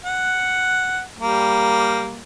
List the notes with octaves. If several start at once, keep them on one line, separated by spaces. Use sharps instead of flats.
F#5
G3 A#3